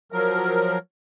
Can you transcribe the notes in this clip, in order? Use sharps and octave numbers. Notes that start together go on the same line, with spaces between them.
F3 F#3 A#4